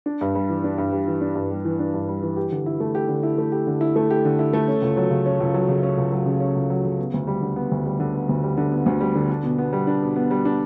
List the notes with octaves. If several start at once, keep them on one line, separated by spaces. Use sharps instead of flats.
D4
G2
G3
E3
D4
G2
G3
E3
D4
G2
G3
E3
D4
G2
G3
E3
G4
D3
E4
A3
G4
D3
E4
A3
G4
D3
E4
A3
G4
D3
E4
A3
C#4
C#2
F#3
C#3
C#4
C#2
F#3
C#3
C#4
C#2
F#3
C#3
C#4
C#2
F#3
C#3
B3
D2
G3
D3
B3
D2
G3
D3
B3
D2
G3
D3
B3
D2
G3
D3
D4
B2
B3
G3
D4
B2
B3
G3
D4